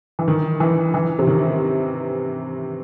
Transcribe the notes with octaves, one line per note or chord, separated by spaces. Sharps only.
E3
D#3
E3
E3
C3
D#3